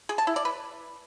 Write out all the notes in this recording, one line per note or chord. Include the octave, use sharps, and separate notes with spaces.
G#4
A5
E4
D5
B4